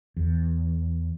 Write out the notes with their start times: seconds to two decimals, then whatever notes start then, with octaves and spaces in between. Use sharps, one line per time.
0.17 E2